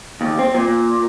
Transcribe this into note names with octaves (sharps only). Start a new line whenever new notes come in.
D#2
C4
A#2